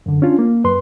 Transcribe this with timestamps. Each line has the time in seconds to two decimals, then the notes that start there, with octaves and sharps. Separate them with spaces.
0.06 F#2 D3
0.22 C#4 D4 F4
0.39 A#3
0.64 F#2 B4 C6